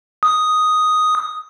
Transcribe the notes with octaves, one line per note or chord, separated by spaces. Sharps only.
D#6